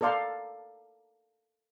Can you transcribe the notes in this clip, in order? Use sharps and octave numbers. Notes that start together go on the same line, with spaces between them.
A4 A#4 D5 F5 C6